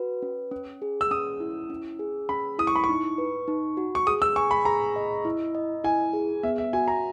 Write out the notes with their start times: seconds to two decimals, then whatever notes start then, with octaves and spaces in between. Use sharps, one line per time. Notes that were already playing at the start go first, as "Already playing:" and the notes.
Already playing: F#4 B4
0.22 C#4
0.51 C#4
0.82 G#4
1.01 E6
1.11 C#4 D#6
1.40 E4
1.70 C#4
1.99 G#4
2.29 C#4 B5
2.58 E4 D#6
2.67 C#6
2.76 B5
2.84 C#6
2.89 D#4
3.18 B4
3.48 D#4
3.77 F#4
3.95 C#6
4.07 G#4 D#6
4.22 E6
4.36 G#5 C#6
4.51 B5
4.65 G#4 A#5
4.96 D#5
5.25 E4
5.55 D#5
5.84 E4 G#5
6.13 G#4
6.43 B3 E5
6.58 E5
6.73 F#4 G#5
6.88 A#5